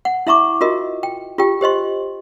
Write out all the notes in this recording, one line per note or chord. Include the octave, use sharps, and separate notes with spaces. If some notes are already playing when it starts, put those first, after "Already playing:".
F#5
E4 E5 A#5 C#6 D6
F4 F#4 A#4 D#5
G5
F4 G4 G5
G4 C5 D#5 C6